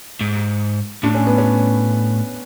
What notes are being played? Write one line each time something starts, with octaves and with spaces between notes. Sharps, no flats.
G#2
A2 D4
C#4
B3
C#4